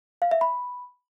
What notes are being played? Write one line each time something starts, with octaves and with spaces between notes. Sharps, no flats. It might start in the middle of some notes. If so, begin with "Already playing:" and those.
F5
E5
B5